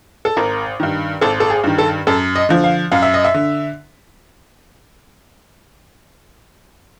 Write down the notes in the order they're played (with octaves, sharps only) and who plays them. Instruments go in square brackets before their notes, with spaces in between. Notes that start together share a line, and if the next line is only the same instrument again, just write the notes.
[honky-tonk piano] A4
G#1 A#4
G2 D#3
G#1 A4
A4
G#4
G2 D#3
A4
F#2 A4
D#5
D3 F3
F5
F#2 F5
E5
D#5
E5
D3